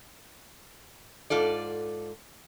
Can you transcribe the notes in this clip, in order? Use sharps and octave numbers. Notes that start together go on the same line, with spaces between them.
G#2 F4 A4 D5